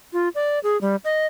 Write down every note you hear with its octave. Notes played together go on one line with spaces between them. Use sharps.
F4
D5
G#4
G3
D#5